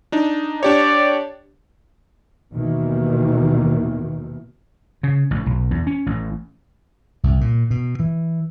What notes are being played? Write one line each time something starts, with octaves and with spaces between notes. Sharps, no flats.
D4 D#4
D4 G4 C#5 D5
D#2 B2 D#3 E3
C#3
A1
B1
E2
C#4
A1
C2
A#2
B2
E3